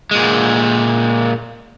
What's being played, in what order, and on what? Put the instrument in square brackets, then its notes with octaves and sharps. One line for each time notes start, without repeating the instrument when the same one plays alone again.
[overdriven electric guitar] A#2 G#3